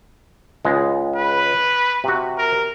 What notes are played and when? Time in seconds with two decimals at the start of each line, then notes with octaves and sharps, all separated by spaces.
0.65 C#2 G#3
1.15 B4
2.04 C3 F#4
2.38 A#4